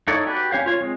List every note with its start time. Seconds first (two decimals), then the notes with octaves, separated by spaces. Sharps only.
0.08 D#4 E4 A4 C#5 D5
0.27 F#4 G4 B4 D5
0.51 C#4 C#5 F5 G6
0.66 F4 C#5
0.81 G#3 C4